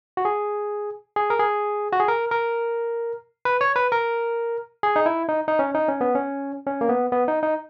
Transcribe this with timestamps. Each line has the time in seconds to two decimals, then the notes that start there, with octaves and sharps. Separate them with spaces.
0.17 F#4
0.25 G#4
1.16 G#4
1.30 A#4
1.39 G#4
1.92 F#4
2.00 G#4
2.08 A#4
2.31 A#4
3.45 B4
3.61 C#5
3.76 B4
3.92 A#4
4.83 G#4
4.96 D#4
5.06 E4
5.29 D#4
5.48 D#4
5.59 C#4
5.75 D#4
5.88 C#4
6.01 B3
6.15 C#4
6.67 C#4
6.81 A#3
6.89 B3
7.12 B3
7.28 D#4
7.43 D#4